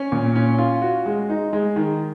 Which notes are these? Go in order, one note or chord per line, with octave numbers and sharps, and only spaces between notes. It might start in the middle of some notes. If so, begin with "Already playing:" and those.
Already playing: C#4
A#2
C#4
F4
F#4
G#3
D#4
G#3
D#3